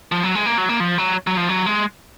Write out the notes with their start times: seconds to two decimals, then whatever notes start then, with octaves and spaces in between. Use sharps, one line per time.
0.12 F3
0.24 F#3
0.35 G#3
0.46 A#3
0.58 F#3
0.69 A#3
0.80 F3
0.98 F#3
1.27 F#3
1.37 F3
1.49 F#3
1.66 G#3